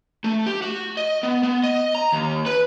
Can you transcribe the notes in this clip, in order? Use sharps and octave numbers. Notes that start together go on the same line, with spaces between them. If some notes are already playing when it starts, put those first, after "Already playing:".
A3
G4
F#4
D#5
B3
B3
D#5
A#5
D#2
B4